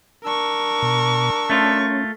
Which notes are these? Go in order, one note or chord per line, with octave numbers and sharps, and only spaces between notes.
D4 A#4 C#6 E6
B2
A3 C#4 F4